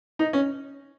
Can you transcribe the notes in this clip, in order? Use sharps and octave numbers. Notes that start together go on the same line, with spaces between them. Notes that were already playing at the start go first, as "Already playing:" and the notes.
D#4
C#4